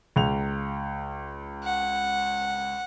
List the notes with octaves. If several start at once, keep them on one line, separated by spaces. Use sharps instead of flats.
C#2 F7
F#5